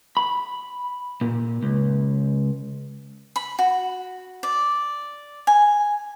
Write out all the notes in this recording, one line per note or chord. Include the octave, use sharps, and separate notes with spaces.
B5
A#2
C#2
B5
F#4
D5
G#5